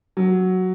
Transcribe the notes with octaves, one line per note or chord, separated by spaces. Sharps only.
F#3